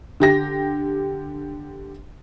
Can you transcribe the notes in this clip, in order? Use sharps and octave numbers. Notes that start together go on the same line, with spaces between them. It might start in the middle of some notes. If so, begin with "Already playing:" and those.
D3 G4 A#6